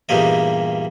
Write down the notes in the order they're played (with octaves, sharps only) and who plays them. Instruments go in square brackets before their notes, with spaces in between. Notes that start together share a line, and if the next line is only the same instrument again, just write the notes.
[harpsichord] E2 G2 A#2 G3 A#3 D#5